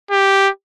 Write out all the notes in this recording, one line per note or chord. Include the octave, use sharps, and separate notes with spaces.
G4